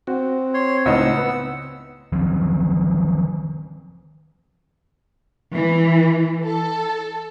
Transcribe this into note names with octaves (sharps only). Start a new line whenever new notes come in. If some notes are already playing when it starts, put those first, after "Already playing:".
C4 F#4
C#5 C6
C#2 A2 D#4 F#5 E6
B3
D#3 F3 F#3 C4
E3
A4